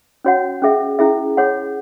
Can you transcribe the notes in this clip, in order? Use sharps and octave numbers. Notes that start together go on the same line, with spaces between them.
C#4 F#4 C#5 F#5
C#4 G#4 E5
C#4 E4 G#4 E5
G#4 C#5 F#5